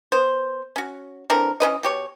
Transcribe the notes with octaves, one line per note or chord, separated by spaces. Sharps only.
B3 C5
C#4 F#4
D3 E3 C4 A#4
E3 C#4 B4 D#5
B2 G4 C#5